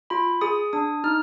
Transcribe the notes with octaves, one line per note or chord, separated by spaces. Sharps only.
F4 B5
G#4 D#6
D4 D#6
D#4 F6